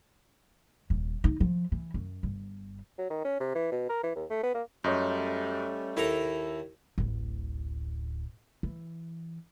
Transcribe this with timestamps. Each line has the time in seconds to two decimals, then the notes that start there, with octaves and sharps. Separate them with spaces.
0.90 D#1
1.24 D#4
1.40 F3
1.72 E3
1.94 F#2
2.23 G1
2.99 F#3
3.10 D#3
3.25 C#4
3.40 C3
3.55 E3
3.72 B2
3.89 A#4
4.03 E3
4.16 D#2
4.30 A3
4.43 B3
4.55 A#3
4.84 F#2 G3 A3 C#4 C#5 D#5 G6
5.97 D#2 E4 A4 A#5
6.98 D1 A1
8.63 E3